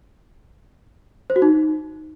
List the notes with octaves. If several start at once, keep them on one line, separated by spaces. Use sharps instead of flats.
C5
F#4
D#4